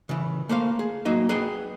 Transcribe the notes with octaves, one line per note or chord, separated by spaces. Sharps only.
C#3 E3
A3 A#3 C5 F5
G#4
F#3 A#3 D#4 D#5
G#4 B4 D#5 F#5 G5